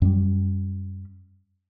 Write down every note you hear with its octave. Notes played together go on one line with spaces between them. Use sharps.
F#2 G3